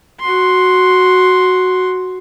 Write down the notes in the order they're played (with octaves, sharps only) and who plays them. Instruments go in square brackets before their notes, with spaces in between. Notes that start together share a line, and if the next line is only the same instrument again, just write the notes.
[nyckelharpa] F#4 C6